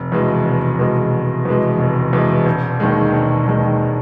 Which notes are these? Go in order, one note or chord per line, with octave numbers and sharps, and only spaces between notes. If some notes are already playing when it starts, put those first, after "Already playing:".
Already playing: F1
E2 B2 G#3
F1
E2 B2 G#3
F1
E2 B2 G#3
F1
E2 B2 G#3
E1
D#2 D#3 G#3
E1
D#2 D#3 G#3